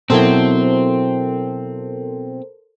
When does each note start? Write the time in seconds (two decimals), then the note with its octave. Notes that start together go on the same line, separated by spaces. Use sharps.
0.10 B2 F#3 C4 E4 A4 A#4 C5